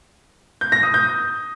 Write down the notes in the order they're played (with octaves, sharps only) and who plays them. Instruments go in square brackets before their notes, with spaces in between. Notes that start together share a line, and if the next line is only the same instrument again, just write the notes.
[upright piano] G6
A#6
D#6
G6